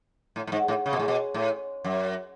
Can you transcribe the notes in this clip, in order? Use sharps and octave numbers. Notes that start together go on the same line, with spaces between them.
A2
A2
G#2
A2
C#3
B2
A2
B2
A2
F#2